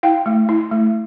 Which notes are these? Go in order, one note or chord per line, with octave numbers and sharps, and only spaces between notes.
E4 F5 G5
A3
E4
A3